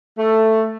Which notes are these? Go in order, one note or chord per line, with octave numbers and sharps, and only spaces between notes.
A3